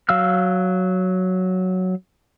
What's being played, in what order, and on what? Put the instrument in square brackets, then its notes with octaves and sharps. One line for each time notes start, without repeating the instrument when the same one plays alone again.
[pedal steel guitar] F#3 F5 E6 F6